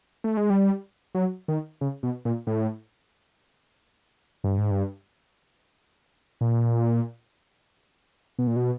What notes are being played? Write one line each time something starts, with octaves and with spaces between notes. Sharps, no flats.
A3
G#3
G3
F#3
D#3
C#3
B2
A#2
A2
G2
G#2
G2
A#2
B2
A#2
B2